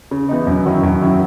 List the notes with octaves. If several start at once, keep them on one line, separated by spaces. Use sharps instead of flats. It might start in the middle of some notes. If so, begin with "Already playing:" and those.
C#3
E3 B3 D#4
F#2
D#3 F#3 C#4 E4
F#2
D#3 F#3 C#4 E4